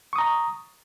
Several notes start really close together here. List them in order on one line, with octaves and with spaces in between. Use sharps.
C#6 D#6 A#5